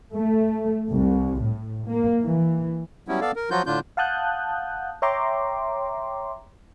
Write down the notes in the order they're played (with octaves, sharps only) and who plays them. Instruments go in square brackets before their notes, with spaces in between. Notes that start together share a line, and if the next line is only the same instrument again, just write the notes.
[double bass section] A3
C2
A2
A#3
E3
[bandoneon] F#3 G3 B3 C#4 E4
B3 A4 D5 F5
A#4
F3 F#3 F4 F#4 G6
A2 D3 D4 F4 G6
[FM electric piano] F5 F#5 A5 D#6 F#6 G6
C#5 E5 G5 A#5 C6 D6